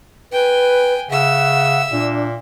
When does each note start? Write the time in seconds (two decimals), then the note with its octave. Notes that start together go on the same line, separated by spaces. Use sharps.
0.32 B4 G5 G#5
1.10 C#3 E5 F#5 E6
1.92 A#2 D4